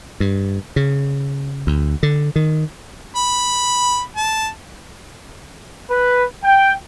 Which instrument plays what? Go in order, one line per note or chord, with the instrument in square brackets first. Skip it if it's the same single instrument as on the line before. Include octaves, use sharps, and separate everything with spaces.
[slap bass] G2
C#3
D2
D3
D#3
[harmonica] B5
A5
[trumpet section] B4
G5